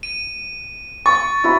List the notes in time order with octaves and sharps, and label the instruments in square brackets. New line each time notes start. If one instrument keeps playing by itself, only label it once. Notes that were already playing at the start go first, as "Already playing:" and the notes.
[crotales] D#7
[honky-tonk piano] C#6 [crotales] A6
[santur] E4 F#4 A#5